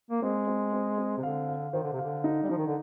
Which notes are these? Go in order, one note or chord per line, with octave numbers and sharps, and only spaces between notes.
A#3
G#3 C4
C4
C4
C4
C3
D3 F5
F5
D#3 C5
D3
C3
D3 F5
D#4
G3
F3 D#4
D#3
D3